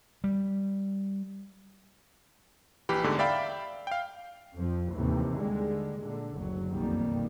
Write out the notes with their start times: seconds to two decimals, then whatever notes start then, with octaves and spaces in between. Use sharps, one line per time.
0.24 G3
2.89 A#1 E3 G4 B5
3.04 E2 G#2 D3 A3
3.19 D5 E5 F5 G5 B5
3.87 F5 G5
4.57 F2 F3
4.94 D#2 A2 C3 E3
5.38 D3 G3 G#3
5.99 A#2 D3
6.35 F#1 D2 F#3
6.71 B1 F2 D#3 G3 A#3